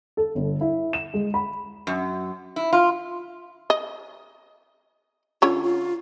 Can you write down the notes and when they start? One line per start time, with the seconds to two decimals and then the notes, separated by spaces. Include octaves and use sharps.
0.17 A4
0.35 G1
0.61 E4
0.93 E7
1.14 G#3
1.34 B5
1.87 F#2
2.56 E4
2.73 F4
3.70 D#5
5.42 D3 C#4 F4 C#5
5.63 F4